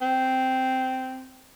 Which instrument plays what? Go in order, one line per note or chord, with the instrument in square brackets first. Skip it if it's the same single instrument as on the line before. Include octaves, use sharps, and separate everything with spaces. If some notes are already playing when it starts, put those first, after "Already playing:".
[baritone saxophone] C4